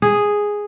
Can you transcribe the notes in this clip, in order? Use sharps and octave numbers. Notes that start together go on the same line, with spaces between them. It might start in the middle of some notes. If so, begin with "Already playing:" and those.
G#4